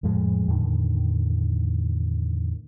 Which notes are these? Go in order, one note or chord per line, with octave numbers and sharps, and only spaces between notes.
F2 A2 F3 G#3
E2 A2 D3 D#3